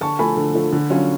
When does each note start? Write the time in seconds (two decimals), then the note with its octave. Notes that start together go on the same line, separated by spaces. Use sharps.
0.01 D3 A5 C#6
0.19 F3 A3 G#5 B5
0.37 D3
0.55 F3 A3
0.73 D3
0.90 F#3 C#4 F4